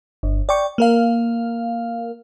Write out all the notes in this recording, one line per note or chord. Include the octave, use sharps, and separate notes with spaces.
G1
D5 G5 C#6
A#3 A#4 F5